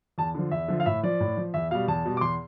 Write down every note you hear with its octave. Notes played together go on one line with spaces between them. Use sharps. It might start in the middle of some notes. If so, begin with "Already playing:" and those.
E2 A5
D3 F3
E2 E5
D3 F3
F5
A2 E5
F3 D5
A2
F3
E2 E5
B2 G3 F5
E2 A5
B2 G3
D6
E2 C6